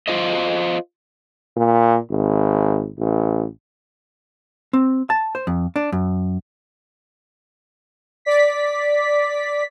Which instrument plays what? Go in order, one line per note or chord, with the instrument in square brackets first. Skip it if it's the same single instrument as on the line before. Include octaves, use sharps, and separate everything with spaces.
[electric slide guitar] F4 C5 D#5
[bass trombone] A#2
G#1
A1
[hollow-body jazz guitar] C4
A5
C5
F2
D4
F#2
[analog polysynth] D5 B6